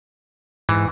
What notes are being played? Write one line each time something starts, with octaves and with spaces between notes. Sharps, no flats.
G#2 E3